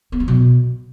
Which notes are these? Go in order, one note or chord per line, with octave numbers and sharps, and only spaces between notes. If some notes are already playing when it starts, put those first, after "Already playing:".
B3
F#3
B2